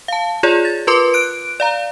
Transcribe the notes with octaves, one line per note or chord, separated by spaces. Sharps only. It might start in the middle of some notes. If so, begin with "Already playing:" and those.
F5 A5
F4 G#4 C#5 D5
A6
F4 A#4 B4 C6 D6
F#6 D7
D5 F5 A#5